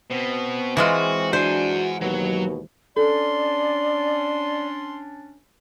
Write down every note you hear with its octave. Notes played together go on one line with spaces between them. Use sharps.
B2 C4 B4
E3 G#3 F4 F#4
D4 F#4 C5 F#5 G#5
D#2 B2 F#3
C#4 D4 A4 D5 C6